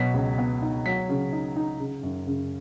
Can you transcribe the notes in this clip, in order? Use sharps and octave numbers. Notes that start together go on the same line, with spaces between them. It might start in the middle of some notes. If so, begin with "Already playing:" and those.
Already playing: B2 F#3 B6
C#2
B3
D#4
F#3 B6
C#3
D#4
D#4
C#3
F#2
C#3